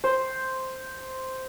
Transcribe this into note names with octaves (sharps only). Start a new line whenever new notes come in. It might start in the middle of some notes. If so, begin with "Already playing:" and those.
C5